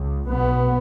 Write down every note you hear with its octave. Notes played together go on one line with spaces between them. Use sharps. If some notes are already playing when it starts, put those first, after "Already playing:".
Already playing: C#2
B1 B2 B3